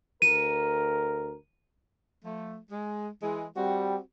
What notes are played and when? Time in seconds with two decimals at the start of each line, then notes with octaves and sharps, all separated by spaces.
0.22 D2 A#4 D#7
2.24 F3 A3
2.72 G#3
3.22 E3 G#3
3.57 G3 C4 F#4